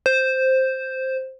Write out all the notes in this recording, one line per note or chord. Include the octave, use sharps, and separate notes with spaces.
C5